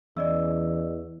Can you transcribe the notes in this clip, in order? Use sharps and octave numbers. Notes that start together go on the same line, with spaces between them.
E2 E3 C#4 D5 D#5 E6